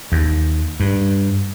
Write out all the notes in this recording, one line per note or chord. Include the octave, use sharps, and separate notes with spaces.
D#2
G2